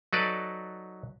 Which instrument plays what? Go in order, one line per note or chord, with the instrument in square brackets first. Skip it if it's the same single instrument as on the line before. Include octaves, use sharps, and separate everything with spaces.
[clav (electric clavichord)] F#3 D#4 A4 B4 D5